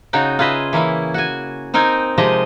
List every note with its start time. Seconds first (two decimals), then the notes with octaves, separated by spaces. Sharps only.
0.13 C#3 D#4 F#4 G5
0.39 F4 G#4 B4 D#5 E5
0.73 E3 A#3 C#4 E4
1.14 F#4 G#5
1.74 C4 D#4 A#4 G5 G#5
2.18 C3 F3 G#3 G4 D#5